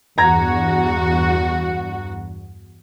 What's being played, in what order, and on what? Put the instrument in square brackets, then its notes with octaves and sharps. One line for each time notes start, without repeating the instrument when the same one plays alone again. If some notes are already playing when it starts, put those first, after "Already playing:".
[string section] E2 G2 F#4 [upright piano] A#5 G#6 A#6